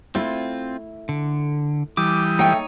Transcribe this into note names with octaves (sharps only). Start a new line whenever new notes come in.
A3 C4 E4 F4
D3
E3 G3 D6 D#6
A3 D#4 C#5 G5